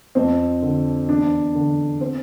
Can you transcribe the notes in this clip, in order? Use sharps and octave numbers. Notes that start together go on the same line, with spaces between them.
F2 C4
D3
E2 D4
D3
C4